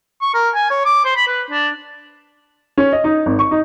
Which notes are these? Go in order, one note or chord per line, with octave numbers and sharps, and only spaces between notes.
C#6
A#4
G#5
C#5
D6
C5
B5
B4
D4
C#4
D#5
D#4
G#1
C#6
D#4